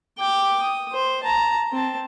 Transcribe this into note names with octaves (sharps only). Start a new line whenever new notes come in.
G5 D6
D#6
C5
A5 A#5
C4 A5